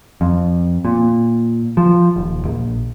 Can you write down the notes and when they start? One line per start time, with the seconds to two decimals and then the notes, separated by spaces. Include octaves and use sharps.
0.21 F2
0.85 A#2
1.77 F3
2.16 D#1
2.45 A#1